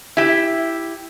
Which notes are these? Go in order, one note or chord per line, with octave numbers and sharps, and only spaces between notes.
E4 G4